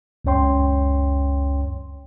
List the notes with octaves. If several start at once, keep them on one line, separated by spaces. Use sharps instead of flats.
C#2 F#2 C#4 C#5 G5 C6